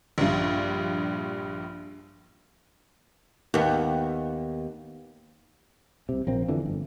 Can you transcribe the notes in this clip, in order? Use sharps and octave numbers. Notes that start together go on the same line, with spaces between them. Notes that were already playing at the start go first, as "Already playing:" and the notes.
A#1 G2
D#2 B3
C2 C3
A#1 A#3 C4
F2 D3 E3
G1